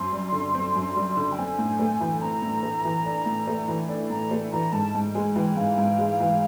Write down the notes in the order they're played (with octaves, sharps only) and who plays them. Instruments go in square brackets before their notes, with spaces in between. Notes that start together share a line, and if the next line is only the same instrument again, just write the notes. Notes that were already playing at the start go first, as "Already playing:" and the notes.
Already playing: [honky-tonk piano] F#2 C4 [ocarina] C6
[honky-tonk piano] G3
D3
C4
F#2
G3
D3
[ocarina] G5
[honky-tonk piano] C4 [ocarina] G#5
[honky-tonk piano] A2
A3
E3
[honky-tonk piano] C4 [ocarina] A#5
[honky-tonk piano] A2
A3
E3
D4
A2
A3
E3
D4
[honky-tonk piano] A2 [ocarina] A#5
[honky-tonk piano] A3
[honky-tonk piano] E3 [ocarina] A#5
[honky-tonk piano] G#2 [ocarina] A5
[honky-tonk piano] G#2
[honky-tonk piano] G#3 [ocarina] G#5
[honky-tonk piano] E3 [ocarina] G5
[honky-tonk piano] G#2 [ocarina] F5
[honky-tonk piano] G#2
G#3
E3